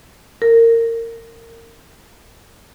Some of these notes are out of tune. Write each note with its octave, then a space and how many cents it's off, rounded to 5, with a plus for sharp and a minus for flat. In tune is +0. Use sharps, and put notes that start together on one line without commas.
A#4 -25